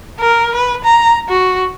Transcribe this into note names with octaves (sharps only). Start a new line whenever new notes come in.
A#4
B4
A#5
F#4